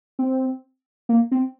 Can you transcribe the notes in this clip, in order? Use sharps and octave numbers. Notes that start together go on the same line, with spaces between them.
C4
A#3
C4